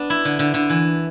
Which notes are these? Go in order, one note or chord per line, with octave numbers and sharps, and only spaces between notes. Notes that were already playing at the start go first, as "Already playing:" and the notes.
Already playing: B3 D4
E4
D3
D3
D3
E3